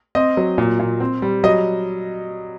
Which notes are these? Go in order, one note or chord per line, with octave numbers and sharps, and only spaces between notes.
C4 D#5
F#3
A#2
A#2
C4
G3
F#3 D#5